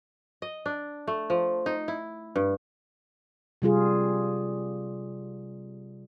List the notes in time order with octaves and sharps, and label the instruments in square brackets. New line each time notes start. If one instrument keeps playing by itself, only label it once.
[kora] D#5
D4
A3
F3
D#4
E4
G2
[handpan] C3 G3 F4 G#4